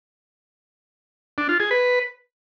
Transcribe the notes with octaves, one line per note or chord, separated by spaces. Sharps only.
D4
F4
G#4
B4